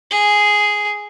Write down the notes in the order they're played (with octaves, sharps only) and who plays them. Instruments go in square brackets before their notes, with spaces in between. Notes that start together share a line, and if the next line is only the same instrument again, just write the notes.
[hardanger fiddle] G#4